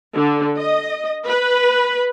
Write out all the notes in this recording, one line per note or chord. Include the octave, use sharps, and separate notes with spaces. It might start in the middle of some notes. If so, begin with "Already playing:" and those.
D3
D#5
B4